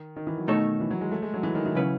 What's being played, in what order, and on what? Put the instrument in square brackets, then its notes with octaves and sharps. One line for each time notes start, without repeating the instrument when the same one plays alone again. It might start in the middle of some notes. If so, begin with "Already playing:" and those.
Already playing: [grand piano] D#3
D#3
E3
F#3
[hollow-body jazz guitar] B2 A3 D#4 A4 C#5 [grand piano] D#3
[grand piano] E3
F#3
G#3
A3
G#3
F#3
E3
D#3
E3
[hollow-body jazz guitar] C#3 F#3 C#4 E4 B4